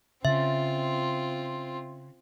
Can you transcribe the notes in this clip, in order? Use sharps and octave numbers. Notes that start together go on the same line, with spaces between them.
C#3 C4 F4 E5